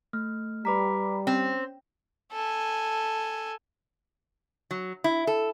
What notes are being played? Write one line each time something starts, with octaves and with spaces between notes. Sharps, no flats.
A3 F6
G3 B4 A#5 B5 D6 B6
C4 C#4 C5
A4 G#5
F#3
E4
A4